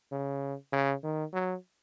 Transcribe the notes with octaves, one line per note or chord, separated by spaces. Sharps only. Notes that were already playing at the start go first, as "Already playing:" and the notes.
C#3
C#3
D#3
F#3